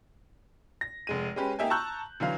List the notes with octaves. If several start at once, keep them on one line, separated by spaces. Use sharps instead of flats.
A#6
F1 G#3 D#7
G#3 C#4 G4 B4
A#3 D#4 G4 E5 G5 G#5
A5 A#5 C#6 E6 F#6 G6
D3 E3 F#3 F5